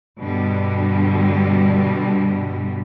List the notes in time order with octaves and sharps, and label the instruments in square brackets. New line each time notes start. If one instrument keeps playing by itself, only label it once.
[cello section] G2 B2 D3 G3